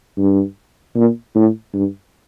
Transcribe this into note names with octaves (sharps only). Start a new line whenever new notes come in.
G2
A#2
A2
G2